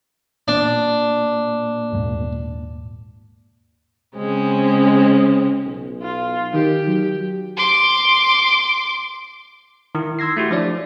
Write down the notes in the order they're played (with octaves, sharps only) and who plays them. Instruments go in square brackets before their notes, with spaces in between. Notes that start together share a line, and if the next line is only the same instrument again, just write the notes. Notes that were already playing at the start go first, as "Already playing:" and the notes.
[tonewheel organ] A#2 [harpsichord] D4
[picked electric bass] D#1 G#2 A#3
[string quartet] C#3 G#3 C4 C#4
[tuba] B1
[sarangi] F4
[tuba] D#3 [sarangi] G4
[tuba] F#3
[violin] C6 D6
[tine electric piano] D#3 E4
C6 E6 G#6 A#6 C7
A3 E4 F#4 G4
F3 D4 C#5 D5